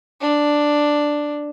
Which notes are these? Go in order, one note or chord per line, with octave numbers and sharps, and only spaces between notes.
D4